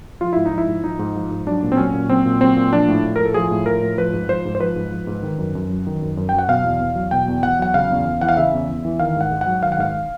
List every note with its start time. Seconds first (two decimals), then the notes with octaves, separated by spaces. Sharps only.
0.21 F3 F4
0.33 G#2 E4
0.46 D#4
0.52 F3
0.58 E4
0.67 G#2
0.84 F3 D#4
0.99 G#2
1.16 F3
1.31 G#2
1.47 F#3 D4
1.63 A#2
1.72 C4
1.77 F#3 C#4
1.94 A#2
2.09 F#3 C4
2.25 A#2
2.41 F#3 C4
2.56 A#2
2.72 F3 D4
2.88 A2
3.04 F3
3.16 A2 A#4
3.25 A4
3.34 F3 G#4
3.51 A2
3.66 F3 A#4
3.82 A2
3.98 F3 B4
4.13 G#2
4.29 F3 C5
4.45 G#2
4.55 C5
4.60 F3 B4
4.76 G#2
4.92 F3
5.07 G#2
5.23 D#3
5.38 F#2
5.55 F#2
5.70 F#3
5.87 D#3
6.02 F#2
6.17 F#2
6.29 F#3 G5
6.39 F#5
6.48 B2 F5
6.64 E2
6.80 E2
6.96 F#3
7.11 B2 G5
7.28 E2
7.43 E2 F#5
7.59 F#3 F#5
7.74 C#3 F5
7.90 E2
8.05 E2
8.21 E3 F#5
8.29 F5
8.37 C#3 E5
8.53 E2
8.69 E2
8.85 E3
8.99 D#3 F5
9.16 G#2 F#5
9.31 G#2
9.41 F#5
9.46 F#3
9.63 D#3 F5
9.72 F#5
9.78 G#2 F5